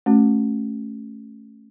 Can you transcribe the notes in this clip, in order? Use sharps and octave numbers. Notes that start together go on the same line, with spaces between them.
A3 C#4 F#4